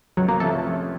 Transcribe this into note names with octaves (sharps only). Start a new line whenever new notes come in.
C#2 F#3
A#3
C3 F3 A3 C#4 A4